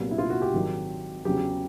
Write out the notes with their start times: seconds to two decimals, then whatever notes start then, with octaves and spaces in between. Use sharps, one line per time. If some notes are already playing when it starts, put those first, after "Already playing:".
Already playing: C2 A#2 F#3 B3
0.11 E4
0.18 F4
0.30 F#4
0.42 G4
0.53 G#1 G#2 D#3 F#3
1.25 E2 C#3 F#3 G4